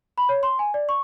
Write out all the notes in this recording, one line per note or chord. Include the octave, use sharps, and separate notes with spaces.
B5
C#5
C6
G#5
D5
C#6